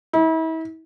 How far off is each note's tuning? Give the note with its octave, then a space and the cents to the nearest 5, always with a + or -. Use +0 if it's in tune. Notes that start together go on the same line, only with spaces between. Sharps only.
E4 -40